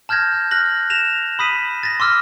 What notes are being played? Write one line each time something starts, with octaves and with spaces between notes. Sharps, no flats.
A5 F6 G6 G#6 A#6
F6 F#6 A#6 F#7
A#6 E7 F7
B5 D#6 B6 D#7
A6 A#6
C6 D6 E6 F6